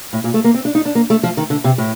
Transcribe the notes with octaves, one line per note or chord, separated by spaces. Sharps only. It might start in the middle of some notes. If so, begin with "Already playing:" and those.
A2
A#2
A3
A#3
C4
D4
D#4
D4
A#3
A3
F3
D#3
D3
C3
A2